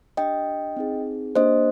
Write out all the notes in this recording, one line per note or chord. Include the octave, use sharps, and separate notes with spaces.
D4 G4 D#5 G5
C4 D#4 G#4
A#3 D4 G4 C5 D#5